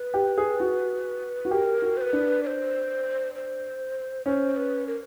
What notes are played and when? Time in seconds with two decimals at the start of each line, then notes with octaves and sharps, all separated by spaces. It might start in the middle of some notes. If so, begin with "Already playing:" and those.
Already playing: B4
0.14 G4
0.38 G#4
0.60 F#4
1.45 F#4
1.51 G4 A#4
1.82 F#4
1.97 C5
2.01 B4
2.13 D4
2.43 D5
2.47 C5
3.35 C5
4.26 C#4 C5
4.57 B4
4.87 A#4